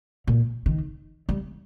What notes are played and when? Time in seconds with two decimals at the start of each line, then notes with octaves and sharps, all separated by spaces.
0.27 A#2
0.66 D#3
1.29 G3